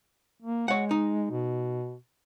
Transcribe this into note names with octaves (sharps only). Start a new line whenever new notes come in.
A#3
G#3 C#5 F#5
D#4
B2